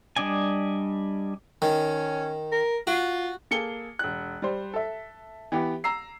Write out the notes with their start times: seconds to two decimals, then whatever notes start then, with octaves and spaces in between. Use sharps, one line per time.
0.16 G3 D4 D5 D#5 G#5
1.62 D#3 C#4
2.52 A#4
2.87 F4 F#4
3.51 A#3 G#4 A4 C#7 G7
3.99 E1 F#6
4.42 G3 C5
4.74 A4 E5
5.52 E3 B3 G4
5.84 A#5 E6 C7